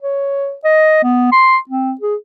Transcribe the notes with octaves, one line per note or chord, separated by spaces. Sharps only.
C#5
D#5
B3
C6
C4
G#4